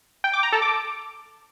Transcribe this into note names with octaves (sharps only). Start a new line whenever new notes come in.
G5
D6
A#5
A4
D6